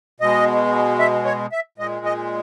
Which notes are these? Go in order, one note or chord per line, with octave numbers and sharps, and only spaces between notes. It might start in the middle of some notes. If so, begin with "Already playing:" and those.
B2 G#3 D#5
E5
C#5
E5
A#2 G#3 D#5
D#5